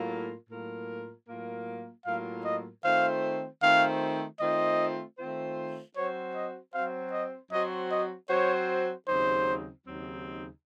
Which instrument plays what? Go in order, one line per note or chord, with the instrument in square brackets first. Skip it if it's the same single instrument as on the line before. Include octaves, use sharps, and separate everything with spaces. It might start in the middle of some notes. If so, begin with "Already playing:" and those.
Already playing: [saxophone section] A2 F#3 A#3 F4 A#4
A2 F#3 A#3 F4 A#4
A2 F#3 A#3 F4 A#4
[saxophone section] A2 F#3 A#3 F4 A#4 [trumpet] F5
[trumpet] D#5
[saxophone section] D#3 A3 C4 F4 C5 [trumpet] F5
[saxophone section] D#3 A3 C4 F4 C5 [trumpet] F5
[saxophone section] D#3 A3 C4 F4 C5 [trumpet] D#5
[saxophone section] D#3 A3 C4 F4 C5
[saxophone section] F#3 C4 F#4 C5 [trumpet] C#5
[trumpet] D#5
[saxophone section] F#3 C4 F#4 C5 [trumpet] F5
[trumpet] D#5
[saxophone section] F#3 C4 F#4 C5 [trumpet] D#5
[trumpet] D#5
[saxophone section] F#3 C4 F#4 C5 [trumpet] C#5
[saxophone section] D#2 C#3 F#3 C4 D#4 [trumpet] C5
[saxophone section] D#2 C#3 F#3 C4 D#4